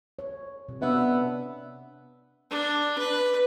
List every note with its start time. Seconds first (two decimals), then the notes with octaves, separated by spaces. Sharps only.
0.19 C#5
0.68 C3
0.82 B3 D4 E5
2.50 D4
2.98 B4